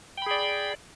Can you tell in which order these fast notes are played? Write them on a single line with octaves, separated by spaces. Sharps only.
G5 B5 G#4 D5